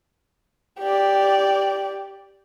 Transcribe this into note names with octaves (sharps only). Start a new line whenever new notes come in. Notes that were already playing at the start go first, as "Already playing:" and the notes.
G4 D5